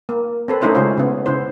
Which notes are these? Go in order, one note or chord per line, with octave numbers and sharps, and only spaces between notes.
A#3
C4 A4 B4
A3 C#4 D#4 E4 C5 C#5
C#3 G#3 C#4 F4 C5
C#3 B3
C#3 E4 C5